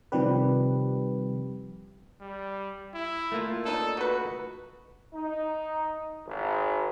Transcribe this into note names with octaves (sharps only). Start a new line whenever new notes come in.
C3 D#3 F3 G3 G4 B4
G3
E4
A3 A#3 F4
D4 D#4 A4
D#4 F#4 B4
D#4
G#1